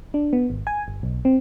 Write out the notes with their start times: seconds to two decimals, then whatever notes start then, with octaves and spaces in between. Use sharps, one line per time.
0.14 D4
0.33 B3
0.50 G#1
0.67 G#5
0.88 G1
1.03 B1
1.25 C4